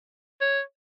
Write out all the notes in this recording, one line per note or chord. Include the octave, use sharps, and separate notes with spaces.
C#5